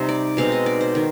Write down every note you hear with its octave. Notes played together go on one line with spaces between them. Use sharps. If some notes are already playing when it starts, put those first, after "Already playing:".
Already playing: C3 G3 C4 D#4 C5
D5
B2 G#3 C4 D#4 F5
D#5
D5
C5
D#3